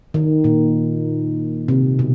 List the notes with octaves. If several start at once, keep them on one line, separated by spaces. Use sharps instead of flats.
D#3
A#2
C3
B2